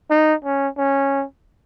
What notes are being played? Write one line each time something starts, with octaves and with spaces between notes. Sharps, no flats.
D#4
C#4
C#4